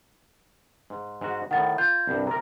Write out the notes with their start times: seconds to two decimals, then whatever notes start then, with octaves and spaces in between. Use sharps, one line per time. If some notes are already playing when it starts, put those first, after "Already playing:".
0.90 G#2
1.21 G#2 F#4
1.51 A2 D#3 F#5 A6
1.78 F4 G6
2.07 C2 G2
2.27 C3 A#4 A#5